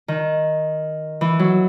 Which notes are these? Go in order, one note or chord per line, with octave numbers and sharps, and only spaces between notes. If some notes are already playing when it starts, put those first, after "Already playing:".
D#3
E3
F#3